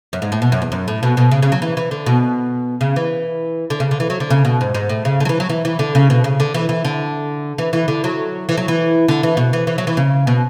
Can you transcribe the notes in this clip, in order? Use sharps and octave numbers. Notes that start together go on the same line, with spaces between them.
F#2
G#2
A2
B2
F#2
E2
F#2
A2
B2
B2
C#3
C#3
F#3
E3
E3
D3
B2
C#3
E3
D3
C#3
D3
E3
F#3
D3
C#3
B2
G#2
G#2
A2
C#3
D3
F#3
E3
F#3
E3
E3
D3
C#3
B2
C#3
D3
E3
E3
D3
E3
E3
D3
F#3
E3
F#3
E3
D3
E3
B2
E3
E3
F#3
E3
C#3
B2